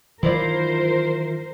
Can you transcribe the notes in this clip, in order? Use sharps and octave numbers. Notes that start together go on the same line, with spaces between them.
D#3 E3 F#3 E4 F4 A#4 C5 D5